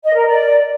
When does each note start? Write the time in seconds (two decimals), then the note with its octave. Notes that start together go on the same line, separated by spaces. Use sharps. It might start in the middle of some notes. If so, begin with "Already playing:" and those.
0.03 D#5
0.15 A#4
0.26 D5